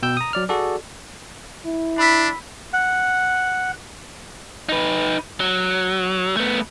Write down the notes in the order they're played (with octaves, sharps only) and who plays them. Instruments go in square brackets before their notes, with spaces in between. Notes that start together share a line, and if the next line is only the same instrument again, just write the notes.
[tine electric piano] B2 G5 E6 G6
A#5 D#6
F#3 D5 F6
F#4 G#4 A4 D5
[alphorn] E4
[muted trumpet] D4 [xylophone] B5 E6 B6
[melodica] F#5
[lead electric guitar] D#4 B4
F#3
A3 B3